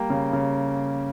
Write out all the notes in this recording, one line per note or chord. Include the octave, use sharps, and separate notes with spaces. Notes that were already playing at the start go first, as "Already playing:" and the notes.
Already playing: G3 A#3 G5
C#3
C#3